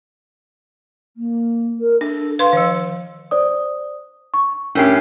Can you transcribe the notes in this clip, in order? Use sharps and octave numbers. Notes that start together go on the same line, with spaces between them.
A#3
A#4
D4 A4
B4 F5 C6
D#3 F3
C5 D5 D#6
C#6
A2 C#4 D4 G4 A#4 C7